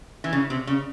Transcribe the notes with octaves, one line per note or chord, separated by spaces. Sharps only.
E3
C#3
C3
C#3